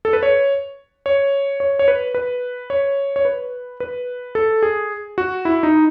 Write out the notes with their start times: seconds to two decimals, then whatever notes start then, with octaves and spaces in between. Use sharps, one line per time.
0.05 A4
0.13 B4
0.23 C#5
1.06 C#5
1.60 C#5
1.79 C#5
1.88 B4
2.15 B4
2.70 C#5
3.16 C#5
3.25 B4
3.80 B4
4.35 A4
4.63 G#4
5.18 F#4
5.45 E4
5.63 D#4